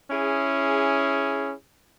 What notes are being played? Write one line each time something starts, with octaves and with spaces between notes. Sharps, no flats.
C#4 E4 G#4